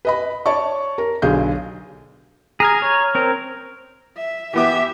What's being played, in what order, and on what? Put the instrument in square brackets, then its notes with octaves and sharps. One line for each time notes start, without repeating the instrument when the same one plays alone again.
[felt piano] B4 D#5 B5
C#5 D5 A5 C#6
A#4
B1 D3 G#4 F5 G6
[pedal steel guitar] G#4 [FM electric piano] A#5 F6 G#6
[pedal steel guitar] C#5
C4 A#4
[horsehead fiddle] E5
[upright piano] E3 B3 D6 [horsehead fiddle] G4 E5